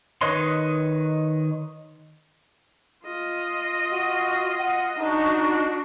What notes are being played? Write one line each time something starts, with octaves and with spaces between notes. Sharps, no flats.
D#3 B4 C#5 D#5 C6
F4 D#5
F#4
F#5
D4 D#4 F#4